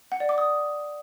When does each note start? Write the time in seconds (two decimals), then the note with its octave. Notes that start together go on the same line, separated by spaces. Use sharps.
0.12 F#5
0.20 D5
0.29 D6
0.38 D#6